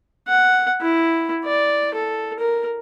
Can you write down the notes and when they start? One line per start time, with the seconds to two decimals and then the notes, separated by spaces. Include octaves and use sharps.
0.27 F#5
0.81 E4
1.45 D5
1.94 A4
2.39 A#4